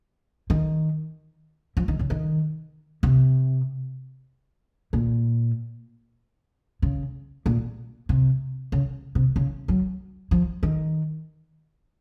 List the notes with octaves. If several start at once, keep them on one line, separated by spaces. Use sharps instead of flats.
D#3
F3
D#3
C#3
D#3
C3
A#2
C#3
A#2
C3
C#3
C3
C#3
F#3
F3
D#3